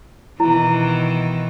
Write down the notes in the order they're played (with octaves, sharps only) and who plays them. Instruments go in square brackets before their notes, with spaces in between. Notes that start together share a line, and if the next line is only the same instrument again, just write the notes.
[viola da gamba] B2 D#3 E3 [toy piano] E4